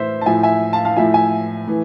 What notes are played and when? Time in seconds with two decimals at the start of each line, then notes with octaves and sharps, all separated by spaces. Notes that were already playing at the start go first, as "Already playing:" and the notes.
Already playing: A2 E3 C5 E5
0.21 A5
0.26 A2 F3 E5 G#5
0.43 E5 G#5
0.73 F5 A5
0.85 F5 A5
0.96 A2 F3 E5 G#5
1.14 E5 G#5
1.67 A2 E3